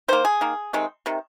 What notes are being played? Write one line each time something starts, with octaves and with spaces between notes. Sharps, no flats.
D#3 A#3 C5
G#4
D#3 A#3
C3 D#3 G#3 C4
C3 D#3